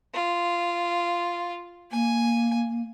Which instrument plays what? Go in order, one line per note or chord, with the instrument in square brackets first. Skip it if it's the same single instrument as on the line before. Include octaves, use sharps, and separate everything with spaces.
[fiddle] F4
[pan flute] A#3 [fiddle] G#5